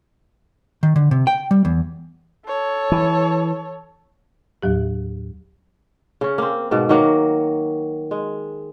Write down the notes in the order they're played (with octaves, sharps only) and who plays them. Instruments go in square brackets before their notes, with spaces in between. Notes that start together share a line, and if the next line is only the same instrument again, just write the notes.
[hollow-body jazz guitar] D#3
D3
C3
G5
G3
E2
[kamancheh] A4 C#5
[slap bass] E3
[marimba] D#2 A2 F#3 G4
[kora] C#3 C#4
A#3 C4
G#2 B2 A#3
D#3 F#3 A#3 F#4
G#3